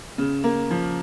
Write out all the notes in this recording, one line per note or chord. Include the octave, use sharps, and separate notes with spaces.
C#3
A#3
F3